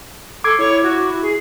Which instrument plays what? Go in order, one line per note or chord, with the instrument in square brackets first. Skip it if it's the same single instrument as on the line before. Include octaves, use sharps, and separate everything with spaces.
[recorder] A4 [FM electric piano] D6 G#6 [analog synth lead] C7
[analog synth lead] E4 [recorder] C#5
[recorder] F#4
G#4